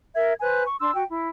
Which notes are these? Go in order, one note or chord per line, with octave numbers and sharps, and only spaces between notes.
A#4 E5 G#6
B4 C5 G#5 F#6
C#6
D4 C6 E6
F#4 G5
E4